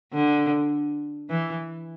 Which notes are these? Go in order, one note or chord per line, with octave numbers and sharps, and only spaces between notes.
D3
E3